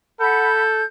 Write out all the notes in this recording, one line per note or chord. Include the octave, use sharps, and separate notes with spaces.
A4 F#5 B5 G6